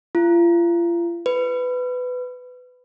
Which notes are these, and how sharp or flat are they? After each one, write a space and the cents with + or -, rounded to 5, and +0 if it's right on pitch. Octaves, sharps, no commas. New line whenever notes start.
F4 -40
B4 +15